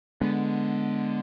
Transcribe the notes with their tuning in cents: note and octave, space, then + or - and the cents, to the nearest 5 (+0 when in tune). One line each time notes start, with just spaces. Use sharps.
D3 +0 G#3 +0 B3 +0